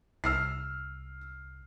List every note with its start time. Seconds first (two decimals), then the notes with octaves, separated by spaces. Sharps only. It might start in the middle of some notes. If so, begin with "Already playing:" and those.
0.24 C2 E6 F6 C7